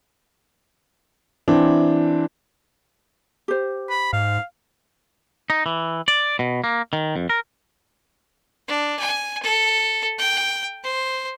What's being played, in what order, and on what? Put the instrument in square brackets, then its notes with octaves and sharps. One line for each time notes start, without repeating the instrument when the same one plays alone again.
[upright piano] E3 C4 D4
[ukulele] G4 C5
[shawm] B5
[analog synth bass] G#2 [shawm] F5
[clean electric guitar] D#4
E3
D5
B2
A#3
D#3
F2
A#4
[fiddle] D4
G#5
A4
G5
C5